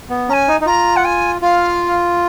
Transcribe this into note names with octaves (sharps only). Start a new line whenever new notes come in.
B3
C#4 G#5 A#5
D#4
D#4
F4 A#5
F#5
G#5
F4 F5